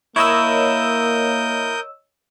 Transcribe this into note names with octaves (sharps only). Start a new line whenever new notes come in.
A#3 E4 A#4 C#5 D#5 D#6 E6 G6